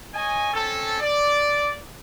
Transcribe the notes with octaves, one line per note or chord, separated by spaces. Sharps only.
C#5 D#5 G#5
C4 C#4 A4
D5